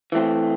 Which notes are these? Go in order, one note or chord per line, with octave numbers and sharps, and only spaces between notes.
E3 A3 C4